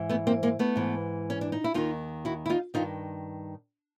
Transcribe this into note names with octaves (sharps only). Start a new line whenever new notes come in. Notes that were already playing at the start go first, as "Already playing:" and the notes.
Already playing: G#2 E3
A3 B3
A#3 C4
G#3 A#3
A3 B3
G#2 E3
C#4
D4
D#4
E4
D#2 D#3 D#4 F4
E4 F#4
E4
D#4 F4
G2 D#3 D#4 F4